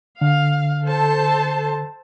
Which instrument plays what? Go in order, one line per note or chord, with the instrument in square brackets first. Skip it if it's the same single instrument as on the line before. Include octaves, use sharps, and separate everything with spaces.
[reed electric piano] D3 [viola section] F5
[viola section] A4 C5 A5